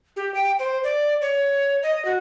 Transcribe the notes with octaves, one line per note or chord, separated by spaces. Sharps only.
G4
G5
C5
D5
C#5
D#5
F#4